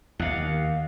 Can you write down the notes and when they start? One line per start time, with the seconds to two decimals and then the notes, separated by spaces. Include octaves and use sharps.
0.20 D#2 D#3 F5 F#5